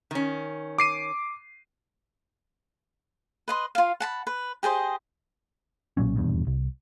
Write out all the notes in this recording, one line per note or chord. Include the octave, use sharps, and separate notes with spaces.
D#3 C#4
D6 C7 D#7
B4 D#5 C6
F4 F5
F#5 A5 B5
B4
G4 G#4 C5 D#5
B1 A#2 F#3 C#4
D#1 E2 G2 B2
C2